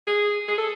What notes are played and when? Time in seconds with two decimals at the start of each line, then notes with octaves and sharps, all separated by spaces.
0.07 G#4
0.48 G#4
0.58 A4